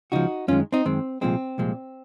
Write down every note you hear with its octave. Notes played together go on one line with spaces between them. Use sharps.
C#2 C#3 F3 D#4 F#4
F#2 D#3 G#3 C#4 F4
C4 D#4
F#2 D#3 G#3 C4
C2 A#2 F3 G#3 C4
C2 A#2 F3 G#3